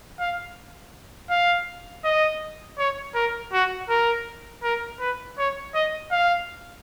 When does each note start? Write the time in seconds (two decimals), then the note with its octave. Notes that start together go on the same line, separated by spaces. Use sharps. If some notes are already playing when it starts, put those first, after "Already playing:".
0.19 F5
1.30 F5
2.04 D#5
2.78 C#5
3.15 A#4
3.53 F#4
3.89 A#4
4.63 A#4
5.00 B4
5.38 C#5
5.74 D#5
6.11 F5